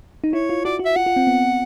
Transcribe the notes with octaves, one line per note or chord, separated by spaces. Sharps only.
D#4
E4 C#5
F4
F#4 D5
F#4
E5
F4 F#5
F4
C4
B3